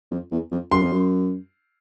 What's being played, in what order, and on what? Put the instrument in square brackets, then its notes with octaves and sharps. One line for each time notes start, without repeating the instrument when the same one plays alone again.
[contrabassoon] F2
E2
F2
[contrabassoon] F#2 [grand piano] C6
[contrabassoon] F2
F#2